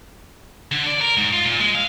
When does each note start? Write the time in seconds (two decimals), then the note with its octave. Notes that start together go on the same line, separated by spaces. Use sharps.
0.71 D3
0.87 D5
1.01 A#4
1.17 G#2
1.33 F4
1.45 A#2
1.60 G#3
1.75 F5